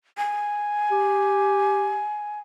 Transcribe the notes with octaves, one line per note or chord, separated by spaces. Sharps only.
G#5
G4